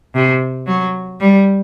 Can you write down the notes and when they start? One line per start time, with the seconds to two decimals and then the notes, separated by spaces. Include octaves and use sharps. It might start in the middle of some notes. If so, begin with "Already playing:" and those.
0.15 C3
0.67 F#3
1.21 G3